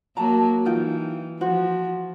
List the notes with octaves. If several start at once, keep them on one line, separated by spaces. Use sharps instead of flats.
F#3 A#3 A5 A#5
E3 D#4 F4 G5
F3 F#4 C5